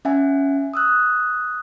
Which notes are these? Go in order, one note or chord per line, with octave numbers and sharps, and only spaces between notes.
C#4 E5 F#5 G#5
D#6 E6 F#6